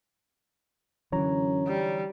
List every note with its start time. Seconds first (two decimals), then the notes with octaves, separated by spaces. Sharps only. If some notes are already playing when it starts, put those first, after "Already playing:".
1.12 F#2 D3 E3 C#5 A#5
1.67 G3